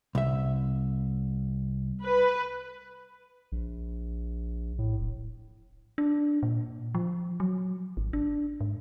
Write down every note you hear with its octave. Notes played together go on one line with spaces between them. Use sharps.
C2 E5
B4
A#1
A2
D1
D4
A#2
F3
F#3
G#1
D4
G#2